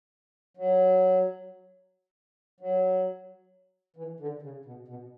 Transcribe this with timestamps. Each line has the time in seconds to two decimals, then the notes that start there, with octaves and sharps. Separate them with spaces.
0.57 F#3
2.60 F#3
3.96 E3
4.20 D3
4.42 C#3
4.65 B2
4.88 B2